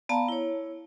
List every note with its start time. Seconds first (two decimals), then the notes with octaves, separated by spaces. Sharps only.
0.09 B3 D5 F5 A5 A#5
0.28 E4 C#5